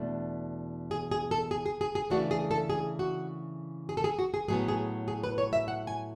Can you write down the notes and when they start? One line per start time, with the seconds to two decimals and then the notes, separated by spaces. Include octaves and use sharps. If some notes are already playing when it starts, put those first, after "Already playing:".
Already playing: E2 B2 A3 D4
0.91 G#4
1.11 G#4
1.31 A4
1.51 G#4
1.66 G#4
1.81 G#4
1.95 G#4
2.10 C#3 E3 A3 D4 F#4
2.31 G#4
2.51 A4
2.70 G#4
2.99 F#4
3.89 G#4
3.97 A4
4.04 G#4
4.19 F#4
4.34 G#4
4.48 A2 F#3 B3 G#4
4.68 G#4
5.08 G#4
5.24 B4
5.38 C#5
5.53 E5
5.68 F#5
5.87 G#5